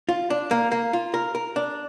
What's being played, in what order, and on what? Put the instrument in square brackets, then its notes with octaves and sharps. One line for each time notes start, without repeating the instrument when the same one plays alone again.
[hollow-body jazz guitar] F4
D4
A#3
A#3
F4
A#4
A#4
D4